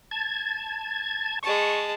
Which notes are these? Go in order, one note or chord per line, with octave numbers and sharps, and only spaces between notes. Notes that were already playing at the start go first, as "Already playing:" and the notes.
A5 G#6
G#3 A5 C#6